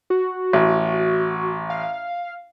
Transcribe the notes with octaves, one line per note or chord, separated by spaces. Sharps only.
F#4
A1
F5